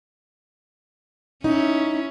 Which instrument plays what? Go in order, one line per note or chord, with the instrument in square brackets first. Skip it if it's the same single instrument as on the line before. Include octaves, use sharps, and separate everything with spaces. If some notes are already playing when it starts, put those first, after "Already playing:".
[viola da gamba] C#4 E4 [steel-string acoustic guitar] D#4